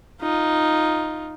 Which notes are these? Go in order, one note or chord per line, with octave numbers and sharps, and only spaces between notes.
D#4 F4